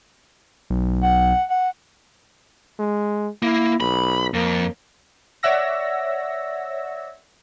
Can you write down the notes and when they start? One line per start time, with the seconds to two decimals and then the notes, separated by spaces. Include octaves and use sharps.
0.70 B1
1.03 F#5
1.50 F#5
2.79 G#3
3.43 A#3 E4
3.80 B1 B5
4.34 F2 A#3
5.43 C#5 D5 E5 F#5 E6 A#6